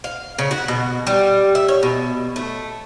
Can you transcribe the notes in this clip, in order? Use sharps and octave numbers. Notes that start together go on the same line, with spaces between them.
F5
C#3
F#4
B2
G3
E5
C#5
B2
A3